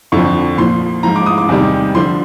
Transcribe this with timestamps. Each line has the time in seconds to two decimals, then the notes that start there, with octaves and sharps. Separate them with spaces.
0.12 F2 D3 F3 C#6
0.58 A#2 F3 C6
1.03 G#2 F3 A#5
1.16 D6
1.26 D#6
1.38 D6
1.49 E2 C3 D#3 G3
1.95 D3 F3 C6